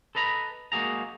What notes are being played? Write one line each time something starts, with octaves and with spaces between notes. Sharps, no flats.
A4 B4 D#5 A#5 B5
G#3 A#3 F#4 G#4 A#5